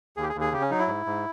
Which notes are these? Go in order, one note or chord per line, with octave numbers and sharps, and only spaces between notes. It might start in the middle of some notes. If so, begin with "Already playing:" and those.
D#2 G#4
G4
G#4
D#2
G#4
C#3 G4
C#4
F#3 D#4
E4
G#2
G#2